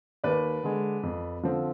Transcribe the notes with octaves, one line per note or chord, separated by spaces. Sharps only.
D#2 B4 D5
D3 G#3
F2
D3 F3 C4